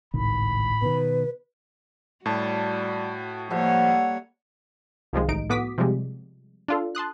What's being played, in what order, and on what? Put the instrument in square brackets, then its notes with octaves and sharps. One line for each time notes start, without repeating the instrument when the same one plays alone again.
[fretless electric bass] G#1 C#2 D#3 [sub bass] A2 [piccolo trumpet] B5
[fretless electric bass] B2 D#3 [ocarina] B4
[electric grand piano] A2 A5 [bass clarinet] G3 [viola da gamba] F#4
[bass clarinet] F3 [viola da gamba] G3 A#3 C#5 [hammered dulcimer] A4 E5 F#5
[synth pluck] C2 D#3 F3 G#3
A1 D#4 D7
A2 B3 F#4 D6 D#6 B6
C3 F3 G3 G#3
D4 F4 A4
A5 C6 D#6 F#6